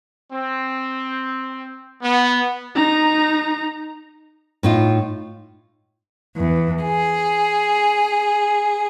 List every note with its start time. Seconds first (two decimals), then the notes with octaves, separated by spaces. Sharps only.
0.33 C4
2.02 B3
2.75 D#4 A#5
4.63 A2 D#4 F4
6.36 E2
6.84 G#4